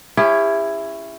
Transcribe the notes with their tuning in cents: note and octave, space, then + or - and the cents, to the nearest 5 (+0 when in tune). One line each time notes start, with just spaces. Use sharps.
C#4 +0 E4 +10 G4 +45